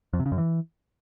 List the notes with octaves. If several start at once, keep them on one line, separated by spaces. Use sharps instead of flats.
F2
C3
C#3
F#2
E3